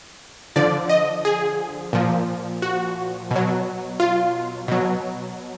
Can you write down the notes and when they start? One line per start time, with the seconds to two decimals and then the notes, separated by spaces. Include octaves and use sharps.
0.56 D3 F3 D5
0.89 D#5
1.25 G#4
1.93 A#2 F3
2.62 F#4
3.31 B2 F#3
4.00 F4
4.68 B2 F#3